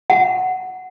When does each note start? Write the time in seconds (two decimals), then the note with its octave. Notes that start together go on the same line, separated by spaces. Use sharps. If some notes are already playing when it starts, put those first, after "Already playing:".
0.10 F#5